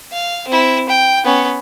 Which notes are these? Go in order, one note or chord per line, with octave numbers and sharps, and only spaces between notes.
F5
C4 E4
G5
B3 C#4